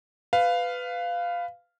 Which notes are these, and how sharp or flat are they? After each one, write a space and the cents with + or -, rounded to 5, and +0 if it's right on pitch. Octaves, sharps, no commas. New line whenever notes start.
B4 +15 F5 +0